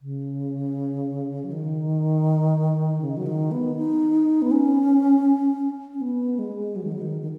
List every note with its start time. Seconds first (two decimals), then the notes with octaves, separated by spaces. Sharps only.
0.02 C#3
1.44 F#3
1.52 D#3
3.01 C#3
3.17 F#3
3.26 D#3
3.52 B3
3.76 D#4
4.42 B3
4.51 C#4
5.94 C#4
6.01 B3
6.39 G#3
6.76 F#3
6.84 D#3
6.92 F#3
7.01 D#3
7.22 D#3